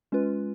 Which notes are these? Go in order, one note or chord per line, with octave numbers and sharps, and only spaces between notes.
G#3 C#4 F4 B4